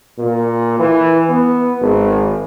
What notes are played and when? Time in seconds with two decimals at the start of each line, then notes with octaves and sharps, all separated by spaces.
0.18 A#2
0.79 E3
1.29 B3
1.80 G#1